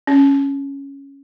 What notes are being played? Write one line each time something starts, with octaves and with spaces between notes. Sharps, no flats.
C#4